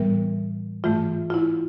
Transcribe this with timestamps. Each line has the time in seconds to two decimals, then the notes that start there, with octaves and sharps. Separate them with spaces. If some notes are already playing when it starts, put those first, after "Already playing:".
Already playing: A2 E3 G3 B3 A#4
0.84 G#2 E3 A3 F4
1.30 F4
1.34 E4